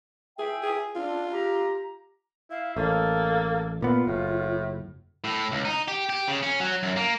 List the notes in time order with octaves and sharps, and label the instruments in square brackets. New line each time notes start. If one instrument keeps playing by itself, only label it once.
[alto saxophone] G#4 [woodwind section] E5 G5
[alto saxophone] G#4
[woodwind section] D4 [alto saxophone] F4
[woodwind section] G4 A#5
[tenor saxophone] E4 [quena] F5
[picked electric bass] A1 [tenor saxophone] A#3 [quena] A4
[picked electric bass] A#2 B3 [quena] F4
[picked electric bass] F#1 [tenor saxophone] A2
[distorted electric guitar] A2
C#2
D#4
G4
G4
C#3
C#4
F#3
F#2
A#3